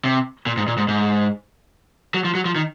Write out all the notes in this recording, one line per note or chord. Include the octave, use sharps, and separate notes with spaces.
C3
A#2
G#2
A#2
G#2
G#2
F#3
F3
F#3
F3
D#3